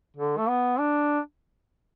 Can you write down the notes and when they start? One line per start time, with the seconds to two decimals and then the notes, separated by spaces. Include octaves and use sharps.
0.17 D3
0.38 A3
0.49 B3
0.79 D4